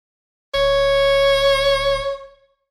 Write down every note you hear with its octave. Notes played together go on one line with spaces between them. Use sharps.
D1 C#5